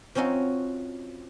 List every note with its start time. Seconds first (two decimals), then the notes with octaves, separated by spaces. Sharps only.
0.15 F3 C4 C#4 D#4 F#4